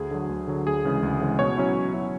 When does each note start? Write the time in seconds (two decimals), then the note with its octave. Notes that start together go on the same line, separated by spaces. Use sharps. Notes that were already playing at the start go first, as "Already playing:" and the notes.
Already playing: D2 G#4
0.11 D3 F#3
0.29 D2
0.47 D3 F#3
0.66 D2 G#4
0.85 C#3 E3 G#3
1.03 D2
1.21 C#3 E3 G#3
1.39 B2 C#5
1.57 F#3 C#4 E4
1.75 B2
1.94 F#3 C#4 E4